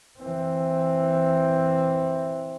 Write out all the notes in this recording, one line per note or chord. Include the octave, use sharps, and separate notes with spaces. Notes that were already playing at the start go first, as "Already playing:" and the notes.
E3 C4